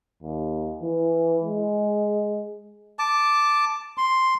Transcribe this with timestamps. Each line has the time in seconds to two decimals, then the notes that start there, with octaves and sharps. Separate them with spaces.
0.22 D#2
0.82 E3
1.43 G#3
2.99 A5 D6
3.98 C6